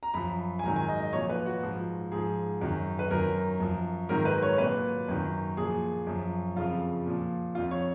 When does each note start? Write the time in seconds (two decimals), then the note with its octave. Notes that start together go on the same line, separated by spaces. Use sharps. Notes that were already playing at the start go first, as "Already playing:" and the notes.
0.03 A#5
0.14 F#2 F3 B5
0.59 G#5
0.63 G#2 D#3 F#3 A#5
0.76 G#5
0.88 D#5
1.00 D#5
1.13 A#2 F3 C#5
1.29 B4
1.46 F#4
1.63 G#2 F3
2.12 G#2 F3 G#4
2.61 F#2 D#3 F#3
2.99 B4
3.10 F#2 D#3 F#3 A#4
3.60 F#2 F3
4.09 G#2 D#3 F#3 A#4
4.25 B4
4.42 C#5
4.58 A#2 F#3 B4
5.08 F#2 D#3 F#3
5.57 A#2 F3 G#4
6.07 F#2 F3
6.56 F2 C#3 F3 F4
7.06 A#2 F3
7.55 F3 F4
7.58 F2
7.71 C#5